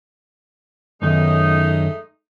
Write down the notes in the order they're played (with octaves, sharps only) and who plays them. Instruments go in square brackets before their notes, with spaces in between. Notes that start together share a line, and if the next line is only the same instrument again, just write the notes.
[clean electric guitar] F#2 D#3 [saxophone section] G#3 A3 D#4